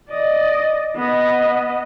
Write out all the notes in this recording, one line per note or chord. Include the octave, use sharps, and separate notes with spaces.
D5 D#5
B3 D#5